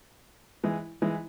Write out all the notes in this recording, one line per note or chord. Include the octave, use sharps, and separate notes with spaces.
E3 G#3
E3 G#3